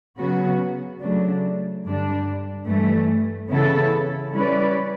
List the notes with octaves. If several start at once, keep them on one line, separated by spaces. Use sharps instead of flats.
C#3 F#3 B3 F#4
C#3 F#3 A3 D4
G2 D3 G3 D4
G2 E3 A3
C#3 E3 B3 E4 A4
G3 C#4 E4 B4 D5